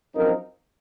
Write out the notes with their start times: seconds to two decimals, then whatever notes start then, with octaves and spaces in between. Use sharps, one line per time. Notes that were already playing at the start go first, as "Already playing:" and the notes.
0.14 F#2 F3 C4 D#4 A#4